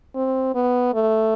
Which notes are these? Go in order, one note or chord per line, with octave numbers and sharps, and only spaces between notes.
C4
B3
A3